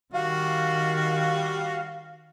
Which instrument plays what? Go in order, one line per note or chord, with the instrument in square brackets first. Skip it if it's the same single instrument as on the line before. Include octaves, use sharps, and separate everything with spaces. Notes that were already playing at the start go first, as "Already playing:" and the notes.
[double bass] D#3 [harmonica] G3 F#4 [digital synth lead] F5